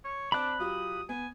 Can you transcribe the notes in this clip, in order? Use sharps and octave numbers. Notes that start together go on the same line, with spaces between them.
C#5
C4 D4 D5 A5 B5 F#6
F#3 F4 G4 D#6
B3 G#5